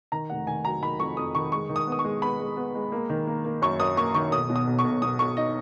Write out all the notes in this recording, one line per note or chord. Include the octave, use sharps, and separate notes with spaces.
D#3 A#5
F1 F#5
D#3 G#5
F#3 A#5
D#3 B5
F2 C#6
F2 D#6
D#3 C#6
G#3 C#6
D#3
D#6
B3
D#6
C#6
G#3
B3 B5
G#3
B3
G#3
A#3
D#3
A#3
A#3
F#2 C#6
F#2 D#6
A#3 C#6
D#3 C#6
B1 D#6
B2
D#6
B1
C#6
B1
B2 D#6
B1 C#6
D#4 D#5